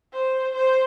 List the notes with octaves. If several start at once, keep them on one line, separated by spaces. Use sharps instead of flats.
C5
C5